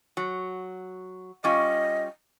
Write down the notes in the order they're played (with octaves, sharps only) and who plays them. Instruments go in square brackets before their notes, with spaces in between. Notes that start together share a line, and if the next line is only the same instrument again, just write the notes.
[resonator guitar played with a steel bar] F#3
[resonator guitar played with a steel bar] G3 C#4 F4 [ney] D#5